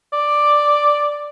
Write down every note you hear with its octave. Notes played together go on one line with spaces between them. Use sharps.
D5